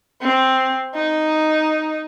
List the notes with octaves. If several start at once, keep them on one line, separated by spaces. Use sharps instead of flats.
C4
D#4